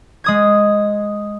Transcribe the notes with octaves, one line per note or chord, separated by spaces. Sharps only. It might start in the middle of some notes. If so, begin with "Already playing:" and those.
G#3 D#6 G#6